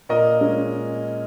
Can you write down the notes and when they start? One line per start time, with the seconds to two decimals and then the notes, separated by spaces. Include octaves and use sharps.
0.09 A#2 A#4 D#5
0.41 G#3 C#4